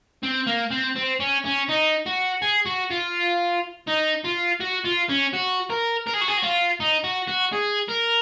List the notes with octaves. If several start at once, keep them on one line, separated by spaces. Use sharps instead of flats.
C4
A#3
C4
C4
C#4
C#4
D#4
F#4
G#4
F#4
F4
D#4
F4
F#4
F4
C#4
F#4
A#4
A#4
G#4
F#4
G#4
F#4
F4
D#4
F#4
F#4
G#4
A#4